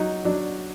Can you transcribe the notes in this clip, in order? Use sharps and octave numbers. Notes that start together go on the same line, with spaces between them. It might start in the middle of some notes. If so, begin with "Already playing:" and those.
Already playing: F#3 D#4
F#3 D4